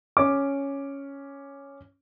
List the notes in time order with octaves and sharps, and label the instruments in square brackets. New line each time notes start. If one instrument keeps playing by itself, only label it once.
[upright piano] C#4 D6